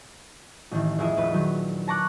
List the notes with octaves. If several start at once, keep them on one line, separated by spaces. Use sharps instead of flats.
A1 D#3 E3
F1 E4 G#4 D#5 E5
F1 A#1 B4
D#3 F#3
A5 A#5 C#6 D6 F#6